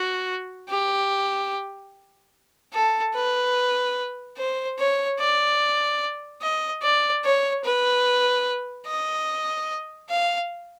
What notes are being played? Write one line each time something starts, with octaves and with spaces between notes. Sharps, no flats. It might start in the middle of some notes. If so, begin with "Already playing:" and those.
Already playing: F#4
G4
A4
B4
C5
C#5
D5
D#5
D5
C#5
B4
D#5
F5